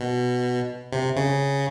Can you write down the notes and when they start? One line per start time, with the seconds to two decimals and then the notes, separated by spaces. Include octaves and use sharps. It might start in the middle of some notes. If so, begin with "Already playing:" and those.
Already playing: B2
0.92 C3
1.16 C#3